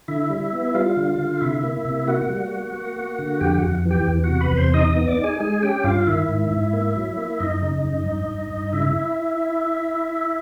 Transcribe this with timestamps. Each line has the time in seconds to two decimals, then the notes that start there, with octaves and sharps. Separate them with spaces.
0.08 D3 E4 E5
0.30 G3
0.53 B3
0.75 G3 F4 F5
0.97 D3
1.19 D3
1.41 C3 E4 E5
1.64 A#3
1.85 C3
2.07 A#3 F#4 F#5
2.29 G3
2.52 A#3
2.74 A#3
2.96 A#3
3.19 D3
3.40 F2 G4 G5
3.57 F#4 F#5
3.63 F2
3.85 E3
3.91 G4 G5
4.08 E2
4.24 F#4 F#5
4.29 C3
4.41 B4 B5
4.51 E2
4.57 C5 C6
4.74 D#4 D#5 D#6
4.90 D#5 D#6
4.96 B3
5.07 D5 D6
5.18 D#4
5.24 G#4 G#5
5.40 G#3 G#4 G#5
5.62 C#4 G4 G5
5.84 G2 F4 F5
6.07 D#3 E4 E5
6.29 G#2
6.51 G#2
6.73 A#3
6.96 F#3
7.18 A#3
7.40 F#2 D#4 D#5
7.62 C#3
7.84 F#2
8.06 G2
8.29 G2
8.51 G2
8.73 C#3 E4 E5